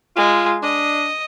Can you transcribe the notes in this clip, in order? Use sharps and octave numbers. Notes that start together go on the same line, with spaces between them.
G#3 F4
D4 D#5